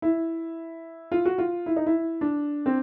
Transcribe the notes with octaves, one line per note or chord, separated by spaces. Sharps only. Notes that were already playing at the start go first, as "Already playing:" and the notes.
E4
F4
F#4
F4
E4
D#4
E4
D4
C4